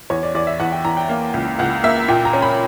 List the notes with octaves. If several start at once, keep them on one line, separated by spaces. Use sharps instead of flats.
E2 C#5
D5
E2 D5
E5
E2 F#5
G5
E2 A#5
G5
A#3
C#2
C#2 F#5
A#3 E5
A#2 G5
A#5
C#4
B5